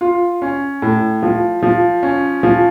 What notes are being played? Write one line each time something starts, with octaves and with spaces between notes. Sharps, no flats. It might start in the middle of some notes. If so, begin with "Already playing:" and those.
F4
C#4
A2
F3
F3
C#4
F3